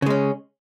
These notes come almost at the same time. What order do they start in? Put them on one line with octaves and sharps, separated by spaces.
C#3 G#3 C#4